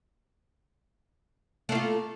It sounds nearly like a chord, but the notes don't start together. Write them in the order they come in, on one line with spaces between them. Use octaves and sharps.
A3 A#3 F4